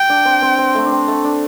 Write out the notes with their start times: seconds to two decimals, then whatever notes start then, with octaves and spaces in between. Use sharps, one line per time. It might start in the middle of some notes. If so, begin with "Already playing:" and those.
Already playing: G5
0.10 D4
0.25 C4
0.42 C4
0.58 C4
0.75 A3
0.86 D4
0.92 C4
1.08 A3
1.24 D4